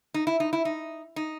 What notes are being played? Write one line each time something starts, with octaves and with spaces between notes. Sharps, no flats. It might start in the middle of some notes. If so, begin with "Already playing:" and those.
D#4
E4
D#4
E4
D#4
D#4